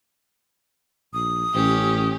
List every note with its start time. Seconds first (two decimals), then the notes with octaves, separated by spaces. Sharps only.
1.14 A#1 D#6
1.55 A1 C#4 G4